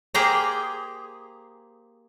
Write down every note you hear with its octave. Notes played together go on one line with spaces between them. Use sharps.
A#3 G4 G#4 C5 G5 A#5